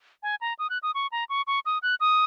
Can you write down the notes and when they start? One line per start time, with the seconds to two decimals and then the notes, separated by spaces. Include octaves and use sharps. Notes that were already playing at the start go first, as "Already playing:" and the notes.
0.23 G#5
0.41 A#5
0.59 D#6
0.70 F#6
0.83 D#6
0.95 C#6
1.12 A#5
1.29 C#6
1.47 C#6
1.66 D#6
1.83 F#6
2.00 D#6